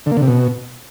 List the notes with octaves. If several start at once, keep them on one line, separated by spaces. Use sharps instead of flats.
D3
A#3
D3
C3
B2